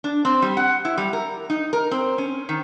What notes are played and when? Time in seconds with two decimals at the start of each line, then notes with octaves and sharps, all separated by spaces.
0.04 D4
0.25 C4
0.42 G3
0.57 F#5
0.85 E4
0.98 G3
1.13 A#4
1.50 D#4
1.73 A#4
1.91 C4
2.18 C#4
2.49 D#3